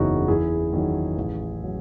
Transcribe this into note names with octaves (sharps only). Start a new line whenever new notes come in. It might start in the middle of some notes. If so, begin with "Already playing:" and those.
Already playing: F#1 E2 C#3 F#3 C#4 D#4 E4 F#4
E2 E4 G#4
D#3 F#3
A1
F#3